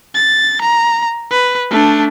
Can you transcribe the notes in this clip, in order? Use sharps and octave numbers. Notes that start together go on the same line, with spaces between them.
A6
A#5
B4
A3 D4